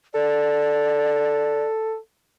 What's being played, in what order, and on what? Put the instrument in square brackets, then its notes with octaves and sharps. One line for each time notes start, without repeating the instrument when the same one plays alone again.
[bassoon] A4 [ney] D5